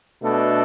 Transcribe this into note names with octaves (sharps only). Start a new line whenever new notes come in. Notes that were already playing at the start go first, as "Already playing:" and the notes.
B2 A3 D4 A4